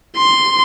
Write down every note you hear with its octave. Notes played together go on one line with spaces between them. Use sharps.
C6